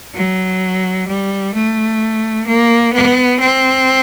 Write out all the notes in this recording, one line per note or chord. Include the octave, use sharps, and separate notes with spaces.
F#3
G3
A3
A#3
B3
C4